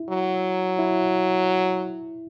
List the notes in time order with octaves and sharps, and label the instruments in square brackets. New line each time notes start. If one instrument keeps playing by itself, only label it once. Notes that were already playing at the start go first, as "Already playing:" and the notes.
Already playing: [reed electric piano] E4
[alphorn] F#3
[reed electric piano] E4